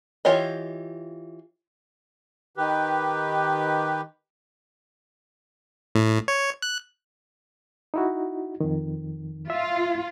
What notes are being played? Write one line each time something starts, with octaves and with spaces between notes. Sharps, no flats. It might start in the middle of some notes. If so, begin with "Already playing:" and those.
E3 F4 G4 C#5 D#5
D#3 G4 B4
A2
C#5
F#6
D#4 E4 F#4
F2 D#3
F4 E5